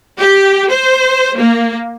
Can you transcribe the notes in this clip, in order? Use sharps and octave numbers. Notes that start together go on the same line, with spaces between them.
G4
C5
A#3